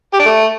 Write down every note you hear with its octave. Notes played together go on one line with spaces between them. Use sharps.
G4
D4
A3